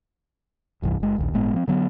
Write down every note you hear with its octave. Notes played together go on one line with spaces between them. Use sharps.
F1 C2 G2 E3
F#1 G#3
A#1 D#2
G1 A2 G#3 B3
F3 C4
D3 F#3 B3